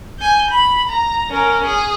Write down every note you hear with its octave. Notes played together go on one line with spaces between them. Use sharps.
G#5 G6
B5
A#5
C#4 A#4
G#4